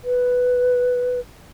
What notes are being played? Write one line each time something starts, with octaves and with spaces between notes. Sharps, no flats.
B4